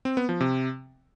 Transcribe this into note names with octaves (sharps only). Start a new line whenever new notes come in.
C4
B3
F3
C3